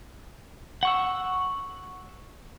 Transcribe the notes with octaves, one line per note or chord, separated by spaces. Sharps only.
F#5 C#6 E6